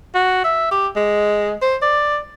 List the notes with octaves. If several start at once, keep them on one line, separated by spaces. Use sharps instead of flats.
F#4
E5
G4
G#3
C5
D5